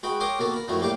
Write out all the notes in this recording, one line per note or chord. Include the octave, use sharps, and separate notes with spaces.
G#3 F#4 B4 G5 B5
A#4 C#5 G5 C6 D6 D#6
B2 D#3 A#3 F#4 A4 A#4
A#4 B5
F#2 D#3 F3 A3 E4 F#4
A2 G3 A#3 G4 F5 D6